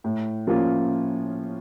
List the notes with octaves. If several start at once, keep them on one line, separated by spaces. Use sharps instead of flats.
A2
F3 A#3 C#4 F4